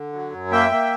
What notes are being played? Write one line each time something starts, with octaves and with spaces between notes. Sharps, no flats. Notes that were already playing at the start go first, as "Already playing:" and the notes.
Already playing: D3
F#3
F#2
A#3 E5 G5
A#3